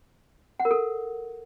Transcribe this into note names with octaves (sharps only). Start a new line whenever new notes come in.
F#5
A#4
A4